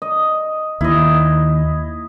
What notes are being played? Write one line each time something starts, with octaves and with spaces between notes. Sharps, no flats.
D#5
D#2 E4 D#5